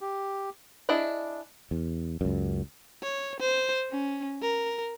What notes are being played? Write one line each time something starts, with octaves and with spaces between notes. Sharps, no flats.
G4
D4 E4 G#4 D5 D#5
E2
C#2 F#2
C#5
C5
C#4
A#4